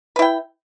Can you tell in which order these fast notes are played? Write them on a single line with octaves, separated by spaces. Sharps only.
B4 E4 G5